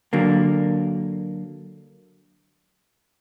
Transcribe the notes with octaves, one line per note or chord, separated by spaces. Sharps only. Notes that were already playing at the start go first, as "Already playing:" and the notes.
D3 F#3 A#3